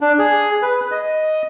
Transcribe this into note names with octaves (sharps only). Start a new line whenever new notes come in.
D4
G#4
B4
D#5